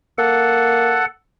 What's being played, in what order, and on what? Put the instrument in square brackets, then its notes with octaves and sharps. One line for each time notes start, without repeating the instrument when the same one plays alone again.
[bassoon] A#3 [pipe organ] A4 F#5